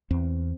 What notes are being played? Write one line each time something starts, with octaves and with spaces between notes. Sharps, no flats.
E2 C4